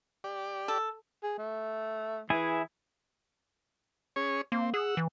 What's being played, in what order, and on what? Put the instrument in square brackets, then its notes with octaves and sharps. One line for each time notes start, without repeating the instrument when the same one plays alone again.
[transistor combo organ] G4 D5
[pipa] A4
[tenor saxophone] G#4
A3
[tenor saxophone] E3 [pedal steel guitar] E4 G#4 G#5
[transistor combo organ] C#4 G#4 C#5
[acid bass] A#3 [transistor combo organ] C4
[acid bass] G#4 [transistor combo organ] F#5 E6
[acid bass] E3